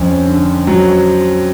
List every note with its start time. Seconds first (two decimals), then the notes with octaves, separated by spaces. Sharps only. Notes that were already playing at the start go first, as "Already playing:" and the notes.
Already playing: F2 C#4
0.26 D3
0.67 F#3